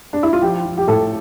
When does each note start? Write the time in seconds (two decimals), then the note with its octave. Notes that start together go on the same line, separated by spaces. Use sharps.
0.13 D4
0.23 E4
0.33 F4
0.42 F3 G4
0.65 F3
0.78 G4
0.88 A2 A4